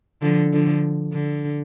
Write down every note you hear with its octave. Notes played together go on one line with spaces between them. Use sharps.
D3 F3
D3 F3
D3